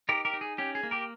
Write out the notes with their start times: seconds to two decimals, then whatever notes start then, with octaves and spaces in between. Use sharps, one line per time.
0.09 D#4 G4 A#4
0.25 G4 A#4
0.34 D#4
0.41 G#4
0.58 C#4 G4
0.75 G#4
0.83 A#3
0.91 G4 A#4